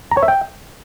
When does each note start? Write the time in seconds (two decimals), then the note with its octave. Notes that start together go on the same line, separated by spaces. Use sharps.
0.11 A#5
0.17 C#5
0.23 E5
0.28 G5